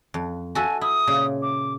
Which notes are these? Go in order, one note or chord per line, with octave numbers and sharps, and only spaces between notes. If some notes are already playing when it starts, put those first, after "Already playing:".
F2
F#4 A4 E5 G#5
E4 D#6
A#2 C#3
D6